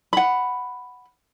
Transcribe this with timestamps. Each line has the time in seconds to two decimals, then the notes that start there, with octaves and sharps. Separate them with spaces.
0.13 F#5 B5